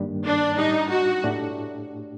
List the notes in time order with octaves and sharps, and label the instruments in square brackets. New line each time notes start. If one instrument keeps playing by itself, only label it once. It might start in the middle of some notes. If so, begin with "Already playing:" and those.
Already playing: [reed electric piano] G2 D#3 G3 A#3 D4
[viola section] D4
[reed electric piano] A2 G3 D4 [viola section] D#4
[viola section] F#4
[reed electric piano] A2 A3 D4 G4